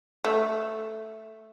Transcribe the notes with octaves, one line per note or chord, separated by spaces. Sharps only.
A3